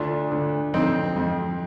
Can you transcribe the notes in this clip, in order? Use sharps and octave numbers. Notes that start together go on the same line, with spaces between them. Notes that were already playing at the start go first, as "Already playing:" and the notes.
Already playing: D2 D4 F4
D2
F2 C4 D#4
F2